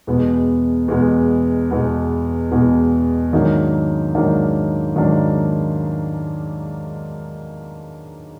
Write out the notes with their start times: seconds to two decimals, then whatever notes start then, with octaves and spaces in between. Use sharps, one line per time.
0.07 E2 B2 G#3 B3
0.88 E2 B2 G#3 B3
1.71 E2 B2 G#3 B3
2.51 E2 B2 G#3 B3
3.33 G#2 D#3 F#3 A#3 D4
4.15 G#2 D#3 F#3 A#3 D4
4.96 G#2 D#3 F#3 A#3 D4